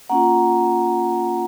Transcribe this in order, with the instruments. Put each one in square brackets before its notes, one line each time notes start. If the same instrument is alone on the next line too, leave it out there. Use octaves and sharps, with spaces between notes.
[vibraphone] A#3 C#4 F4 F#5 A#5